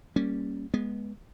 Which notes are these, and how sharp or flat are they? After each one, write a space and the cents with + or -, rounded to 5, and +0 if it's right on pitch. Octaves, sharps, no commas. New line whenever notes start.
G3 +0 A#3 +0 C#4 +0
G#3 +0 B3 -20